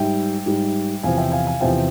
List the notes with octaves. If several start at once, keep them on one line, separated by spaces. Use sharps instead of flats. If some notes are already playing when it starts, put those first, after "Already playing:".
Already playing: G#2 G3 E5 G5
G#2 G3
E2 C3 F3 F5 G#5
E5 G5
F5 G#5
F5 G#5
E2 C3 F3 E5 G5